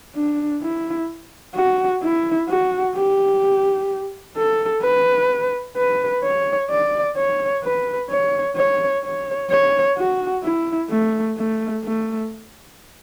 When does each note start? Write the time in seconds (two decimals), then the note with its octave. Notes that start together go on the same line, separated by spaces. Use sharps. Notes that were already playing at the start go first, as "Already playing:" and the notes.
0.15 D4
0.63 E4
1.56 F#4
2.02 E4
2.49 F#4
2.96 G4
4.37 A4
4.82 B4
5.77 B4
6.23 C#5
6.70 D5
7.17 C#5
7.64 B4
8.10 C#5
8.56 C#5
9.04 C#5
9.50 C#5
9.98 F#4
10.43 E4
10.90 A3
11.37 A3
11.84 A3